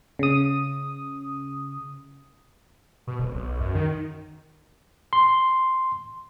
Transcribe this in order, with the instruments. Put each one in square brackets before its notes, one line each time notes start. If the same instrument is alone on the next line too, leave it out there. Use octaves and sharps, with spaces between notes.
[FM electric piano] C#3 D#6
[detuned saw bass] B2
D1
B1
F#2
D#3
[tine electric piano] C6